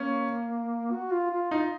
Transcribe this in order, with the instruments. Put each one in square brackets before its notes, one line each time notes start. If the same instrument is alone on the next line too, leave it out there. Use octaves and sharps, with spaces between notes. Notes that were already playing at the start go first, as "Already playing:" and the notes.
Already playing: [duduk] A#3 [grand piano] C#4
[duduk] F#4
F4
F4
[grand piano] D#4 [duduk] F4